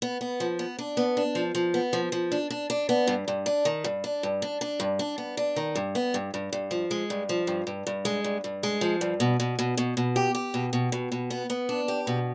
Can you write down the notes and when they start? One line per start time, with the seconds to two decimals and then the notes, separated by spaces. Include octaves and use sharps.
0.02 B3
0.21 B3
0.40 F3
0.59 B3
0.79 D4
0.97 B3
1.17 D4
1.35 F3
1.55 F3
1.74 B3
1.93 F3
2.12 F3
2.32 D4
2.50 D4
2.70 D4
2.89 B3
3.07 G2
3.28 G2
3.46 D4
3.65 D#3
3.84 G2
4.04 D4
4.23 G2
4.42 D4
4.61 D4
4.80 G2
4.99 D4
5.18 B3
5.37 D4
5.56 D#3
5.76 G2
5.95 B3
6.14 G2
6.34 G2
6.53 G2
6.71 F3
6.91 G#3
7.10 G2
7.29 F3
7.47 G2
7.67 G2
7.87 G2
8.05 G#3
8.24 G2
8.44 G2
8.63 G#3
8.81 F3
9.01 G2
9.20 B2
9.40 B2
9.59 B2
9.77 B2
9.97 B2
10.16 G4
10.35 G4
10.54 B2
10.73 B2
10.92 B2
11.12 B2
11.30 B3
11.50 B3
11.69 D4
11.88 G4
12.07 B2